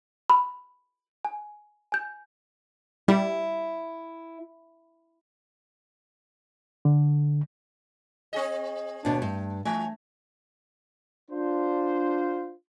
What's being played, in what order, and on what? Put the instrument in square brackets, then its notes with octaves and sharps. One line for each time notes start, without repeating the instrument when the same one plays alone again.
[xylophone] B5
G#5
G#5 G6
[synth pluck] G3 [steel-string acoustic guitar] E4
[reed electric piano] D3
[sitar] C4 G#4 D#5
[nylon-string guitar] D#2 B2 [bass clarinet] D4
[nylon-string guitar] G2 [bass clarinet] A3
[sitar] E3 [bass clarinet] A3 [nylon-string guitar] G#5
[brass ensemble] D4 F4 C5